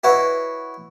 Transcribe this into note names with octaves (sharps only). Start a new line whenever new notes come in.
E4 F#4 B4 C#5 D#5